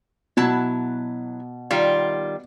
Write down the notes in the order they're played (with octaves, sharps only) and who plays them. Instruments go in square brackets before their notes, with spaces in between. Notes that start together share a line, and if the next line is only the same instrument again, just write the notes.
[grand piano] B2 [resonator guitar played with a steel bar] F#3 E4 A5
[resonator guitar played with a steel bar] D#3 G3 F4